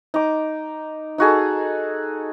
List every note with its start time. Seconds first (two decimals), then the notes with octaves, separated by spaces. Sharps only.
0.14 D#4 D6
1.18 D#4 F#4 G#4 A4